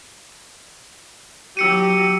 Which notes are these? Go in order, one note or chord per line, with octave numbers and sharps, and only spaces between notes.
F#3 G4 E6 C#7 D#7